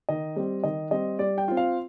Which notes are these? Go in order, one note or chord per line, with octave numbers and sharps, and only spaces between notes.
D#3 D#5
G3 C4
D#3 D#5
G3 C4 D#5
G3 D5
G5
C4 F4
F5